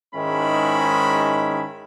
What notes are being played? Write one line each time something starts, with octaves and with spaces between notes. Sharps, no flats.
G#2 D#3 G#3 C#4 E4 B5